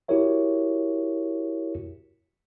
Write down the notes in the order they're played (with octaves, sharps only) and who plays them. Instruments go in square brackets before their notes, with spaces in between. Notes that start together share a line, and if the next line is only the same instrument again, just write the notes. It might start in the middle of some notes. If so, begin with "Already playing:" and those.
[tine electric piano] E4 F#4 G4 A#4 C#5 E5